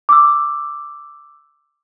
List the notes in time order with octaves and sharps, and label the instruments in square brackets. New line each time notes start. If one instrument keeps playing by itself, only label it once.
[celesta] D6 E6